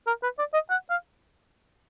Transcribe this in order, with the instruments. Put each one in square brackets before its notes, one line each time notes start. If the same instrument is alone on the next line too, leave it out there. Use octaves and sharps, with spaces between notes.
[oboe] A#4
B4
D5
D#5
F#5
F5